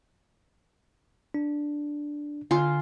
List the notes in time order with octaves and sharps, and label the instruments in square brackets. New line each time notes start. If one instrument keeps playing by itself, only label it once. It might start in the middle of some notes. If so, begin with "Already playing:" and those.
[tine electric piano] D4
[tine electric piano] D3 G#5 C6 [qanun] F4